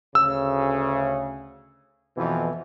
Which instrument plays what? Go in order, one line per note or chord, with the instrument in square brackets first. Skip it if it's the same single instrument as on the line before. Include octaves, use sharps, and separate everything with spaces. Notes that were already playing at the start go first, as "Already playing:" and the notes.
[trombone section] D2 C#3 [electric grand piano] E6
[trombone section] F2 B2 E3